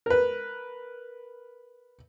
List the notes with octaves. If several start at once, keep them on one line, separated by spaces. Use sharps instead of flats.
A#4 B4